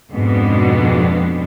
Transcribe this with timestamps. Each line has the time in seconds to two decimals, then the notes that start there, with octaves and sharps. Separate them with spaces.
0.11 F2 G#2 B2 G#3 B3 D4